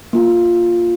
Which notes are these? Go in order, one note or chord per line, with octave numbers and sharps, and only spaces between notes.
A#3 F4